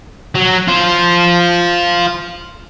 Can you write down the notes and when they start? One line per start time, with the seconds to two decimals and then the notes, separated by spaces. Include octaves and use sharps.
0.35 F#3
0.68 F4 C5